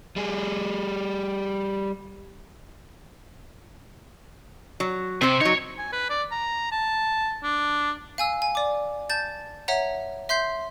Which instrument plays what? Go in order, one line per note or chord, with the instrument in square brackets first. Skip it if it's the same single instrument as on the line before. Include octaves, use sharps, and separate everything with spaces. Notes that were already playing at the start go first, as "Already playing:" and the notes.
[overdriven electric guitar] G3 G#4
[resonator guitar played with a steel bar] F#3
[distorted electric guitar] C3 [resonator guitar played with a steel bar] C4 C5
[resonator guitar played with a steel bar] F#3 D#4 [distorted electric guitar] C#5
[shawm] G#5
B4
D5
A#5
A5
D4
[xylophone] F5 G#5 E6
G#5
D5 D6
A5 G6 A6
C#5 E5 F#5 A#5
E5 C6 G6 C7